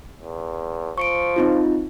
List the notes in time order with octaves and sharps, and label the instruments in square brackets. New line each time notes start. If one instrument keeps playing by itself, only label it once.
[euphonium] E2
[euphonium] F3 [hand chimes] C#6 C#7 D7
[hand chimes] C4 D#4 F4